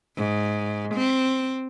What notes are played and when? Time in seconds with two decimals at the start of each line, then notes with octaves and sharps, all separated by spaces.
0.16 G#2
0.94 C4